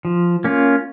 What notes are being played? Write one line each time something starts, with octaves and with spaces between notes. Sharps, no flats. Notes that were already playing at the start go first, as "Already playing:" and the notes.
F3
A#3 C#4 F4